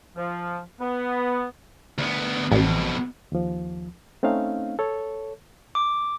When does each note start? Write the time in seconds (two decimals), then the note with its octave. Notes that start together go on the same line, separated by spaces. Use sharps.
0.17 F3
0.80 B3
1.98 D2 B3
2.51 A1 F2 B2
3.32 D#2 F3
4.23 A3 C4 C#4 D#4 F5
4.79 A4 C#5
5.75 D6